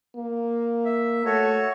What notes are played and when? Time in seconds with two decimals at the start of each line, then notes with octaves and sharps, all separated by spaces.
0.16 A#3
0.85 E5
1.25 A3 F#4 A4 C#5